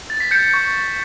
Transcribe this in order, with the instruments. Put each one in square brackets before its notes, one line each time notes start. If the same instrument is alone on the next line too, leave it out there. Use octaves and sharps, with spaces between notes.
[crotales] A6
B6
G6 C#7
C#6